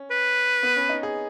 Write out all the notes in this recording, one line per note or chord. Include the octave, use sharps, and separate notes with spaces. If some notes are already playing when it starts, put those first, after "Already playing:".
Already playing: C#4
B4
B3
C#4
D#4
G#4